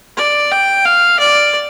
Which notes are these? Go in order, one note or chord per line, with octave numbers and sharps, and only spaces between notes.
D5
G5
F5
D5